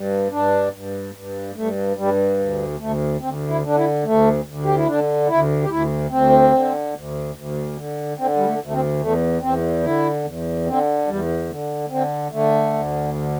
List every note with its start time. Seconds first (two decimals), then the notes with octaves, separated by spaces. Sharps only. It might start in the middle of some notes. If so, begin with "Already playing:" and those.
Already playing: G2
0.31 G2 D4
0.73 G2
1.14 G2
1.55 G2 A3
1.97 G2 G3
2.39 D2
2.80 D2 A3
3.21 D2 C4
3.49 E4
3.63 D3 D4
3.77 E4
4.04 D2 A3
4.45 D2
4.65 G4
4.76 E4
4.87 D3 D4
5.28 D2 E4
5.62 G4
5.69 D2 E4
6.11 D2 C4
6.53 D3
6.94 D2
7.35 D2
7.76 D3
8.18 D3 C4
8.37 G3
8.46 A3
8.60 D2
8.67 A3
8.72 C4
9.00 E2 A3
9.41 E2 C4
9.83 D3 E4
10.24 E2
10.66 D3 C4
11.07 E2 G3
11.49 D3
11.90 D3 C4
12.31 D3 A3
12.73 D2
13.14 D3